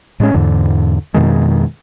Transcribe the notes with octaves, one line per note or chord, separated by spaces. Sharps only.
A2 G#3 C#4
E2 G#2 D3
F2 B2 D#3 G#3